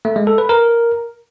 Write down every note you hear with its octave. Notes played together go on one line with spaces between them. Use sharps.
A3
G#3
A4
B4
A#4